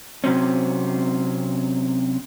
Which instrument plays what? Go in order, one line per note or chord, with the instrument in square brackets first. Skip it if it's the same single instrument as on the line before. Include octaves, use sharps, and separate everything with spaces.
[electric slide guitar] C3 F#3 C4 C#4